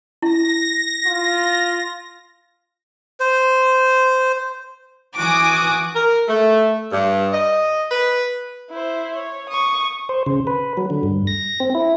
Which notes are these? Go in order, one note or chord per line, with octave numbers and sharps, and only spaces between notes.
E4 A#6
F4
C5
E3 F#4 G#5 D6 D#6
A#4
A3
G2
D#5
B4
E4 C5
C#5
C#6 D#6
C5
C#3
B4
F#3
D3
G2
A#6
C4
E4